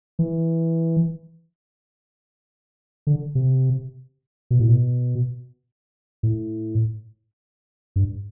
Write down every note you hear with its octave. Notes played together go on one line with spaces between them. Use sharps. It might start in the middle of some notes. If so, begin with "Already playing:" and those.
E3
D3
C3
B2
A2
B2
A2
G2